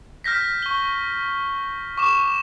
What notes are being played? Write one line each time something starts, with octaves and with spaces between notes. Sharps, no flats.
F6 G6 A#6 B6
C#6 G7
C#6 D6 E7